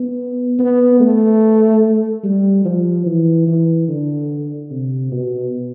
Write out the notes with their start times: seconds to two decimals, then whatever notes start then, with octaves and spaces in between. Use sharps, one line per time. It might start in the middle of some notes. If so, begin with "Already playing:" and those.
Already playing: B3
0.59 B3
1.00 A3
2.24 G3
2.65 F3
3.06 E3
3.47 E3
3.88 D3
4.71 C3
5.12 B2